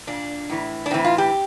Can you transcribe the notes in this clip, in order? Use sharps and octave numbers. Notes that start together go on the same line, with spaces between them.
A#2 D4
A2 E3
D4
A2 E3 C4
F4
G4